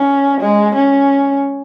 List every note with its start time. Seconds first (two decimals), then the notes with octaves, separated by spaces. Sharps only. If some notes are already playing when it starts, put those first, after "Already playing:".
Already playing: C#4
0.41 G#3
0.75 C#4